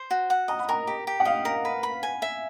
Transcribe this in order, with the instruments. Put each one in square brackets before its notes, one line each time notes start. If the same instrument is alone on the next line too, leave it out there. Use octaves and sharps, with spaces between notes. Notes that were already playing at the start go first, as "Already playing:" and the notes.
Already playing: [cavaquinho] C5
F#4
F#5
[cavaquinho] D#5 [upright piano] A#5
[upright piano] B5
[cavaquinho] A#4 [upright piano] A#5
[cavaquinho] G4
G4
[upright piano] F#5
[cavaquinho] D#5 [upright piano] F5
[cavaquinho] A#4
B4
B5
G#5
E5